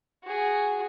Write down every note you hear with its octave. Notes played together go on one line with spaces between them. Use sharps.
F#4 G#4